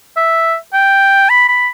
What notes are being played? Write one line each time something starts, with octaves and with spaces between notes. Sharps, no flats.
E5
G5
B5
B5